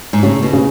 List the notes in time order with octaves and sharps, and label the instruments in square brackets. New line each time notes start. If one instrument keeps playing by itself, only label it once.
[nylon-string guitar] G#2
[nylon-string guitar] A2 [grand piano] C#3
[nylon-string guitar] B2
[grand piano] C#3